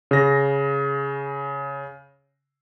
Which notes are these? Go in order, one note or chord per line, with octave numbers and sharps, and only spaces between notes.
C#3 A#6